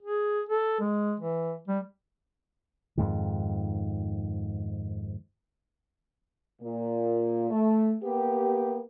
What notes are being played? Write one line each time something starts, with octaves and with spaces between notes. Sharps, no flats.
G#4
A4
G#3
E3
G3
F2 G#2 D#3
A#2
A3
A#3 B3 G4